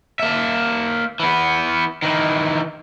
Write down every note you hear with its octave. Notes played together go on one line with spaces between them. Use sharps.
A#3 E5
E3 B3
D#3 E3